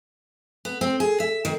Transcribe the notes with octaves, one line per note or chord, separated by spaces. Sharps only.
B3
C4
G#4
E5
D#3